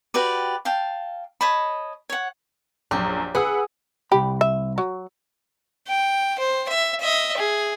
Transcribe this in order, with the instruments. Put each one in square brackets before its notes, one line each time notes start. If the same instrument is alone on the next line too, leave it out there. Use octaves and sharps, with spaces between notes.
[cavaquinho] F#4 G4 B4 D5
F5 G5 A5
C#5 D#5 A5 B5
C#5 F#5
[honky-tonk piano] A#1 F#2 [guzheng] G4
[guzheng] G#4 [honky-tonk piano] B4 F#5 E6
[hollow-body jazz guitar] C2 B5 [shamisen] G4
[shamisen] E5
F#3
[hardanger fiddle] G5
C5
E5
D#5 E5
G#4